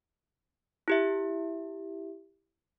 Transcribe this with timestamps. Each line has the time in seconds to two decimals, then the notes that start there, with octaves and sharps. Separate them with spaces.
0.88 E4 G4 E5